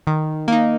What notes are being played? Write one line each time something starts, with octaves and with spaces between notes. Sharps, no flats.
D#3
A#3 D#4